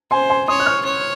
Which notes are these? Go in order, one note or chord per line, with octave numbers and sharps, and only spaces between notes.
C5 G#5 C6
G#5 C6
C#5 C6 D#6
F#6
C#6 F6
C#5